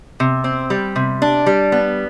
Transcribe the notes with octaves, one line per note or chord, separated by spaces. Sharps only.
C3
C4
G3
C3
D4
G3
B3